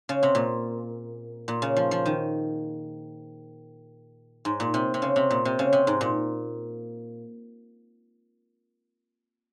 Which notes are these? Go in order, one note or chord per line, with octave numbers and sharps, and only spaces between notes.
C#3
C3
A#2
A#2
C#3
F3
F3
D#3
G#2
A#2
C3
C3
C#3
C3
A#2
C3
C#3
C3
G#2
A#2